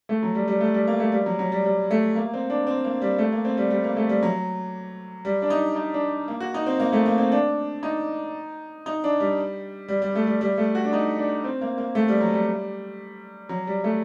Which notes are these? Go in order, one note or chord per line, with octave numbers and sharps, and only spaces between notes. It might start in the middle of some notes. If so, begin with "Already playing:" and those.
A3
F#3
G3
G3
A3
G3
A#3
A3
G3
F#3
F#3
G3
G3
A3
A#3
C4
D4
C4
A#3
G3
A3
A#3
C4
G3
G3
A#3
A3
G3
F#3
G3
D4
D#4
D#4
D4
A#3
F#4
D#4
C4
A#3
A3
A#3
C4
D4
D#4
D#4
D4
G3
G3
G3
A3
G3
G3
A3
F#4
D4
D#4
D4
C4
A#3
A#3
A3
G3
F#3
G3
F#3
G3
A3